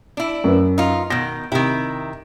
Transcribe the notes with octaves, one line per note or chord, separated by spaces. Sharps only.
D4 E4
F#2 B4
D#4 F4
B2 D#3 A#6
C3 D#3 E4